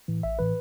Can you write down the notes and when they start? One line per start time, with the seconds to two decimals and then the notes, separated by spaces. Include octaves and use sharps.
0.08 A2 E3
0.23 A1 E5
0.39 A2 E3 B4